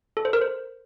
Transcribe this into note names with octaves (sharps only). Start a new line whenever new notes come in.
A4
C5
A#4
C5